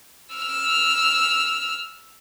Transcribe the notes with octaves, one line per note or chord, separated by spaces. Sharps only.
E6 F6